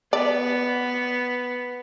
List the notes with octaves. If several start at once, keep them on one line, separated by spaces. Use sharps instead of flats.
B3 D5